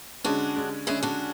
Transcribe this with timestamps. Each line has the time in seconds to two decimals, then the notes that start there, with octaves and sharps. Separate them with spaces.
0.24 D3 G#3 C#4 D4 F#4
0.56 D3 G#3 C#4
0.87 D3 G#3 C#4 E4 G#4
1.03 D4 F#4